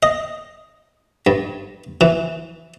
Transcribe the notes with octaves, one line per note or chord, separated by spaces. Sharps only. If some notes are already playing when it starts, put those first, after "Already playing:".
D#5
G2
E3